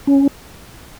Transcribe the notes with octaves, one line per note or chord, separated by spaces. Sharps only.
C#4